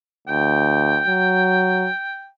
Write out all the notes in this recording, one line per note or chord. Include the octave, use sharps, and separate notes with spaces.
D2 G5
F#3